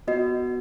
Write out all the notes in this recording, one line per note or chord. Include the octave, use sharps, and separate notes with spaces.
B3 F#4 D#5